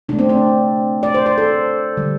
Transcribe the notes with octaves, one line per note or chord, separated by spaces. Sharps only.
C3 A3 D4
C4
D4
D5
C5
C5
A4
D3 G3